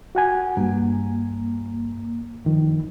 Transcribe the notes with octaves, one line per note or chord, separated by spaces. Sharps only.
F#4 F#5 G#5
G2 A#3
F#2 D#3 F3